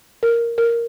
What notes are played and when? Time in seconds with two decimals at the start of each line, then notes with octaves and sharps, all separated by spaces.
0.23 A#4
0.58 A#4